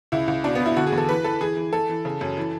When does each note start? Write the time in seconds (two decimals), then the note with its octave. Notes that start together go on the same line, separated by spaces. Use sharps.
0.12 C#2 E4
0.28 C#2
0.44 B2 D4
0.55 B3
0.60 B2
0.66 E4
0.77 D3 F#4
0.87 G#4
0.92 E2
0.97 A4
1.09 E3 B4
1.24 E3 A4
1.41 E3 G#4
1.57 E3
1.73 E3 A4
1.89 E3
2.05 C#3
2.21 F#2
2.37 E3